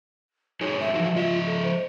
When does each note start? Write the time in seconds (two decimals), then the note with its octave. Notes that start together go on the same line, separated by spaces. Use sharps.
0.61 F#3 D#4 G#4 C#5
0.80 E5
0.94 E3 F3 F#4
1.15 F3 F4 D#5 E5
1.47 A4
1.63 C5